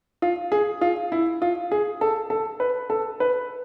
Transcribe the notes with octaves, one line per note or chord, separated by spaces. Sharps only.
F4
G#4
F4
E4
F4
G#4
A4
A4
B4
A4
B4